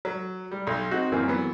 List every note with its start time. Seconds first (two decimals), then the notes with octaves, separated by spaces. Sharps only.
0.05 F#3
0.52 G3
0.67 B1
0.91 C4 D#4 F#4
1.12 F#2 E3 A#3 C4
1.28 E3 F#3 B3